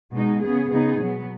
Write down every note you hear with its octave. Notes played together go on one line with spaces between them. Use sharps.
B2 G#3 D#4
C#3 B3 G#4
C#3 B3 D#4 G#4
B2 F#3 B3